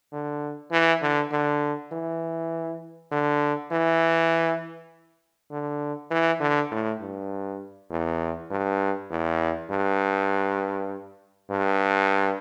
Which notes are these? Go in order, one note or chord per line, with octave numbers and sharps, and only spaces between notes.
D3
E3
D3
D3
E3
D3
E3
D3
E3
D3
A2
G2
E2
G2
E2
G2
G2